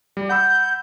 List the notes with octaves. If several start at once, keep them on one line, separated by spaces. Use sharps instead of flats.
G3
F#5 B5 E6 G6